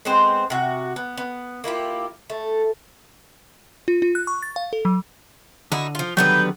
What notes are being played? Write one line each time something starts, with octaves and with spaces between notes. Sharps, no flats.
G#3 B3 C4 C5
C3 F#4
B3
B3
A#3 E4 F4 G4
A3
F4
F4
F#6
C#6
A6
F5
A4
F#3
D3 D#4 E4 F#4
F3 F4
D3 D#3 F#3 G3 B3 B4 G6